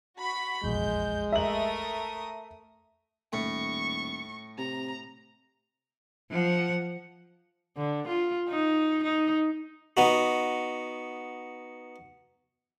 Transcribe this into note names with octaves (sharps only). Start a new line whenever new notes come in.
F#4 B5 B6
F1 A#1 E2 G#3 G6
A3 A#4 E5 D#6 F#7
D#1 A2 C#6
C3 A#5
F3 F#5
D3
F4
D#4
D#4
B3 D#4 F#4